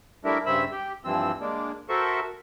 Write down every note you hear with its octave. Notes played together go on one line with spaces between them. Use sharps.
G3 A3 D4 E4 A#4 E5
G2 C#3 C4 E5 B5 E6
G4
G2 E3 F3 C4 E6
G#3 A#3 D4
F#4 A4 A#4 C5 E5 C#6